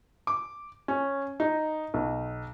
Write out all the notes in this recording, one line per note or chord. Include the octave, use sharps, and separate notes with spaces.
D6
C#4
D#4
B1